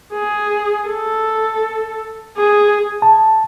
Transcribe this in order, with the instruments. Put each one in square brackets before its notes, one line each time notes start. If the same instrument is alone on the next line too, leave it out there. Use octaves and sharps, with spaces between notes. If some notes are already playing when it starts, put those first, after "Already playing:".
[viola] G#4
A4
G#4
[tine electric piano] A5